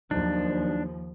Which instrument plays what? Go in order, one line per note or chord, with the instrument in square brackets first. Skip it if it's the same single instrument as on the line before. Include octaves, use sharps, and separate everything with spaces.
[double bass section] D#2 F3 [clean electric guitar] F#3 D#4 [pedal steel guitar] D4